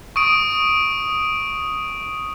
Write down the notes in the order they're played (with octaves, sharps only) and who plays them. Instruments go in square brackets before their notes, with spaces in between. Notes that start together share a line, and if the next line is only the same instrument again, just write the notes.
[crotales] C#6 D#6 D7